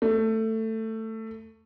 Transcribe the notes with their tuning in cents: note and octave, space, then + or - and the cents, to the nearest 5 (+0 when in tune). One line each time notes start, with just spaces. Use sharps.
A3 +15